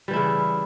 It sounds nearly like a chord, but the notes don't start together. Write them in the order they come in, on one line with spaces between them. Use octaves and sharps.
G3 E3 E4 C#3